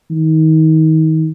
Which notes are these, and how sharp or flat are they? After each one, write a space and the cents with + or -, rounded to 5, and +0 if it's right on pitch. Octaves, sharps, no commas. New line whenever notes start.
D#3 +30